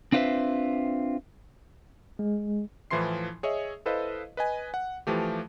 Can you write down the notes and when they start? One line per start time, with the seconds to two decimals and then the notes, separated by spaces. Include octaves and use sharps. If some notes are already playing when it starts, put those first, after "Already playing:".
0.12 C4 D4 F4 B4 C5 E5
2.19 G#3
2.91 A2 E3 F3 E4 C6 C7
3.43 G#4 C#5 D#5 E5
3.86 E4 A4 B4 C5 D#5 F5
4.37 B4 D#5 G#5
4.74 F#5
5.07 E3 F3 A3 G4